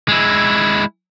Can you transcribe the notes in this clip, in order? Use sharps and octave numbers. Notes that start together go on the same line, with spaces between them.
G#3 E4